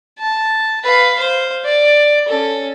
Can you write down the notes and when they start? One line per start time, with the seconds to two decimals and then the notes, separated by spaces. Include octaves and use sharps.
0.19 A5
0.84 B4 F5
1.14 C5 F5
1.65 D5
2.28 C#4 A4